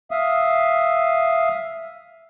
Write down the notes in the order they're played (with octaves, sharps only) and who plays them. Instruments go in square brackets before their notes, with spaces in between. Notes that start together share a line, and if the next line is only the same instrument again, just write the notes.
[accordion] E5 F5 D#6